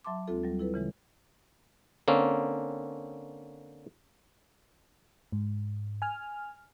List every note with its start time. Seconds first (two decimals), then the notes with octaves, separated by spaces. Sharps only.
0.05 F#3 E5 A5 C6 D6
0.28 D2 G#3 C4 F4 A4
0.44 F#3 G3
0.59 E4 A4 B4
0.74 C#3 E3 G#3
2.08 D3 A#3 C4 C#4
5.32 G#2
6.02 G#5 F6